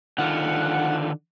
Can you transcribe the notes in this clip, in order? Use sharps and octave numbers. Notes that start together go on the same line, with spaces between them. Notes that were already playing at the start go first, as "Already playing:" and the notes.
D3 D#3 F4 F#5